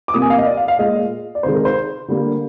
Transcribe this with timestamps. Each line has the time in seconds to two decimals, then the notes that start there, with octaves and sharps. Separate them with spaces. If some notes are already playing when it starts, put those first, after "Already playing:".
0.08 D6
0.14 C3 G3 A#3 D#6
0.22 G#5
0.30 F5
0.38 D#5
0.46 D5
0.57 F5
0.68 F5
0.79 A#2 G#3 D#5
1.35 D5
1.43 C3 D#3 G#3 C5
1.54 A#4
1.65 C5
2.08 D3 G3 A#3